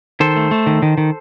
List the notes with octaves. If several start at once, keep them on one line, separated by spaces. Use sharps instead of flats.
D#3 A4 C5
A3
A3
D#3
D#3
D#3